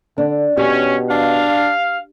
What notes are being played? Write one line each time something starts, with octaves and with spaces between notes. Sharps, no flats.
D3 D4
B2 C#4 G4
D4 F5